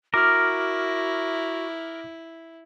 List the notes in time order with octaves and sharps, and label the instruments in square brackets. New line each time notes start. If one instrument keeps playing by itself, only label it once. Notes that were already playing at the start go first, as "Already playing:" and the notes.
[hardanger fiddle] E4 [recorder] F#4 [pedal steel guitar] A#4 [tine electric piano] D6 F6